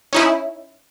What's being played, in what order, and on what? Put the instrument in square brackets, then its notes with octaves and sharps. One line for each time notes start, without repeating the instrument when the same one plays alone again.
[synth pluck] C#4 D#4 E4